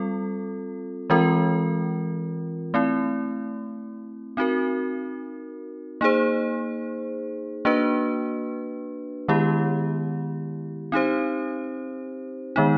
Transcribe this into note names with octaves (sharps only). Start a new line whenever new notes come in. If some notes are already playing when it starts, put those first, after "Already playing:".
Already playing: G3 C4 F4 A4
E3 G#3 C4 F4 A#4
A3 C4 E4
C4 D#4 F#4 A#4
A#3 D#4 G#4 C5
A#3 D4 F#4 B4
D#3 G#3 B3 E4 G4
C4 D#4 G4 C5
D#3 G#3 B3 D#4